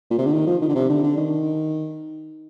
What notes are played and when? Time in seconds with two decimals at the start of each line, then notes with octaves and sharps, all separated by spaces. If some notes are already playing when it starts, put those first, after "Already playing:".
0.11 A#2
0.18 C3
0.26 D3
0.33 D#3
0.47 F3
0.62 D#3
0.69 D3
0.75 C3
0.89 D3
1.03 D3
1.17 D#3